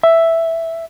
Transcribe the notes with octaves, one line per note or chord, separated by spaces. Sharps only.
E5